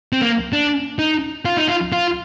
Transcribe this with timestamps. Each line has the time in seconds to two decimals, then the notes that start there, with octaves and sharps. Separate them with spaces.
0.13 C4
0.22 A#3
0.53 D4
0.99 D#4
1.45 F4
1.57 D#4
1.68 F4
1.92 F4